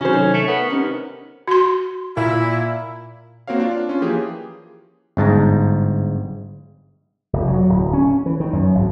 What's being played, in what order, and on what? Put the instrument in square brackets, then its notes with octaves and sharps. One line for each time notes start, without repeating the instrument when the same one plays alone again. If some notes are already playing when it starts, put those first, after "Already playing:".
[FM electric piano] C3 D#3 F#3 [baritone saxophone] C#4 [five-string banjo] F#4 G#4 C5
[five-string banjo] D#4 A4 [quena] C#5
[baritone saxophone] A3 [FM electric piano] C#6
[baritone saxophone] B3 [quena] A#4
[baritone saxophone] C3 [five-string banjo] C#4 D#4
[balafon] F#4 C6
[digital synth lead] A#2 [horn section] E4
[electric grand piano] A#3 C4 F#4 C#5 F5
D4 F4
C#4 F4
E3 F3 A#3 G4 G#4
[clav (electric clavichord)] G1 G#2 A5 A#5
[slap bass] F1
F#3
D1
C#4
E3
D#3
F#2
G#1